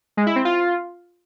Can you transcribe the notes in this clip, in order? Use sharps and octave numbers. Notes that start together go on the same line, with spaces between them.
G#3
E4
C4
F4